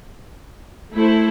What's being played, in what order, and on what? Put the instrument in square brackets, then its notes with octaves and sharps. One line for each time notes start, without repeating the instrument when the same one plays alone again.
[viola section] A3 E4 A4 C5